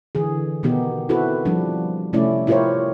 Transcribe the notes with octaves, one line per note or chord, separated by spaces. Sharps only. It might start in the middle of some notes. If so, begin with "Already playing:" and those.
D3 E3 G#4
B2 D#3 B3 D#4 G4
C4 E4 F#4 A4 B4
F3 G3 C4 D4
C3 A3 C#4 E4 D5
E4 F4 G4 A#4 C5 C#5